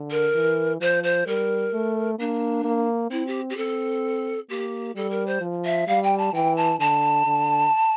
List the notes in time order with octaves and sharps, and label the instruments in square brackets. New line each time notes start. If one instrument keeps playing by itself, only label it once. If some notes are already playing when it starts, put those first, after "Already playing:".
Already playing: [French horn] D3
[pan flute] A#4
[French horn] E3
[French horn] F3 [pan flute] C5
[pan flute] C5
[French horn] G3 [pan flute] A#4
[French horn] A3
[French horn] A#3 [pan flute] D4
[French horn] A#3
[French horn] C4 [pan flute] E4
[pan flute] G4
G4
[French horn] C4 [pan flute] A4
[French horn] A#3 [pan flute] G4
[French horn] G3 [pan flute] A4
[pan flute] A#4
C5
[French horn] F3
[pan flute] E5
[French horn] G3 [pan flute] F5
[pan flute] G5
A5
[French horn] E3 [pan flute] G5
[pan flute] A5
[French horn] D3 [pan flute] A5
[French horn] D3